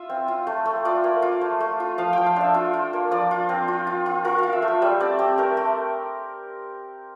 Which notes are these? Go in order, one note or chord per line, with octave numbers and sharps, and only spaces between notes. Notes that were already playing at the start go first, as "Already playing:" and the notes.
Already playing: F4 E5
C4
F4
A3
A3
F4 D5
A#3
F4
A3
A3
F4
F3 F5
F3 G5
F5
D4 E5
F4
F4
A#3
F3 D5
F4
C4
F4
F4
F4
F4 A#4
F4 F5
E5
A3
E5
G3 E5
C4 D5
C4 G4
A3 A#4
A3